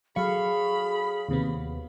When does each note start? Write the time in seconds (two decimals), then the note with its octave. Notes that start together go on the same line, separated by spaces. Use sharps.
0.16 F#3 G#4 A4 F5 B5 C#6
1.29 D#2 C3 B3